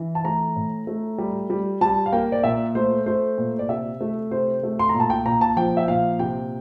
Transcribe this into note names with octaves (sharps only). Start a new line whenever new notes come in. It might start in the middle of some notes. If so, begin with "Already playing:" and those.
Already playing: E3
A5
A3 A#5
A2
A3
G3
G3
G3 A5
F5
A#3 G5
D5
A#2 E5
A3 C5
A3 C5
A#2
D5
C3 E5
A3
C3 C5
A3
C6
A#2 A#5
A5
G5
A#2 A#5
A5
F3 G5
E5
A#2 F5
C3 G5